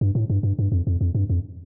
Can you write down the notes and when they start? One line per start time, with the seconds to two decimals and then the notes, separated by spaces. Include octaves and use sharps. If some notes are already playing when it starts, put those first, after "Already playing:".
0.01 G2
0.15 A2
0.30 G2
0.43 G2
0.59 G2
0.72 F2
0.87 F2
1.01 F2
1.15 G2
1.30 F2